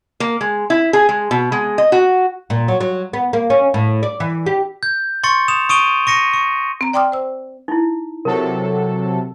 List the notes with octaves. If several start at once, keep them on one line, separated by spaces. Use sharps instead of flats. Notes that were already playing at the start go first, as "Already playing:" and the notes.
A#3
G#3
E4
G#4
G#3
B2
G#3
D#5
F#4
A#2
F#3
F#3
B3
A#3
C#4
A2
D5
E3
G4
G6
C6 C#6 A6 C#7
D#6 E7 F7
C#6 D#6 D7 D#7 F7 G7
C#6 A#6 C#7 D#7
C#6
C4 A#5
D5 G5 C6 D6 D#6 F6
C5 E6
D#4 E4
C3 F#3 A4 A#4